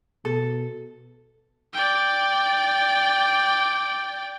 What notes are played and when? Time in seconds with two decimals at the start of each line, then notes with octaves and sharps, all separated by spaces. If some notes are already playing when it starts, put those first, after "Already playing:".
0.25 B2 A4
1.73 D5 G5